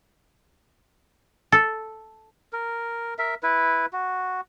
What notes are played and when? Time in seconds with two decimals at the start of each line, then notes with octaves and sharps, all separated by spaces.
1.52 A4
2.53 A#4
3.19 A#4 E5
3.43 E4 B4
3.93 F#4